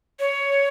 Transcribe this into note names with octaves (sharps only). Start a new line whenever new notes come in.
C#5